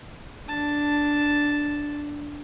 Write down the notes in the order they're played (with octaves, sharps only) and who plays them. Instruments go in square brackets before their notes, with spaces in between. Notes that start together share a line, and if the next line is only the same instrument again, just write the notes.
[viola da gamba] D4 [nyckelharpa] A5